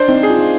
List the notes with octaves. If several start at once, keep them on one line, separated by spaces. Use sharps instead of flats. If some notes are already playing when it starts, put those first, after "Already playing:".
Already playing: D4 C5
C4 D#4
G#4
F4
D#4